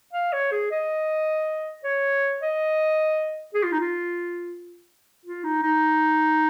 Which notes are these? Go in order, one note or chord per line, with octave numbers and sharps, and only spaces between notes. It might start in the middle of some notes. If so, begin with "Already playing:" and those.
F5
C#5
G#4
D#5
C#5
D#5
G#4
F4
D#4
F4
F4
D#4
D#4